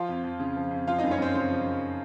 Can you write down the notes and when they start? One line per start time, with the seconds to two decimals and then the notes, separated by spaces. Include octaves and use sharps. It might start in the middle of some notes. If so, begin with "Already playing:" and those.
Already playing: F3 F4 F5
0.09 F2
0.24 F2
0.40 C#3
0.56 F3
0.71 F2
0.87 F3 F4 F5
0.98 D#4 D#5
1.04 F#2
1.11 C#4 C#5
1.19 F#2 C4 C5
1.34 C#3 C4 C5
1.50 F3
1.67 F#2